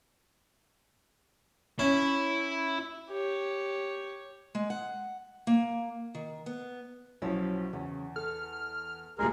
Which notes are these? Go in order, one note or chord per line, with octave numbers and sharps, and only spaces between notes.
C#4 E4
G4 C#5
G#3
F#5
A#3
D#3
B3
B1 F3 F#3 C#4 E4
E2 C#3
A4 F6
D2 A#2 G3 G#3 G#4 A#4